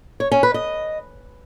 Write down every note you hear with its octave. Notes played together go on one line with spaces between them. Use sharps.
C#5
C#4
B4
D#5